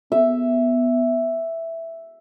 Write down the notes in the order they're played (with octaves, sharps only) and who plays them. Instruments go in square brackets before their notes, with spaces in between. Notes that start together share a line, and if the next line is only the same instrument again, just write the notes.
[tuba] B3 [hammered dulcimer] E5